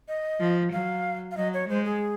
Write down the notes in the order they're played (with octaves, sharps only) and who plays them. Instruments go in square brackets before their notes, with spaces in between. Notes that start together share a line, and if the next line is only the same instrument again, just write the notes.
[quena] D#5
[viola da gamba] F3
[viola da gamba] F#3 [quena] F5
[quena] F5
[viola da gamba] F#3 [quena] D#5
[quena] C#5
[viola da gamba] G#3 [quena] C5
[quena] G#4